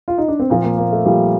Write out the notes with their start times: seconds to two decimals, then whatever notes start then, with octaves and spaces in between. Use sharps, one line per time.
0.08 F4
0.18 D#4
0.28 D4
0.40 C4
0.50 A#2 F3 A#3
0.64 A#3
0.78 A#3
0.92 A3
1.05 A#2 F3 G3